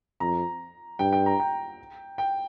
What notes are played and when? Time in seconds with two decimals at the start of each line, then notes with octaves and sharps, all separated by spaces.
0.20 F2 A#5
0.99 G2 G5
1.12 G5
1.26 A#5
1.40 G5
2.18 G5